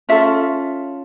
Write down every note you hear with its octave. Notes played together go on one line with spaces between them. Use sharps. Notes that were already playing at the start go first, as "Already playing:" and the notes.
C#4 F4 A4 E5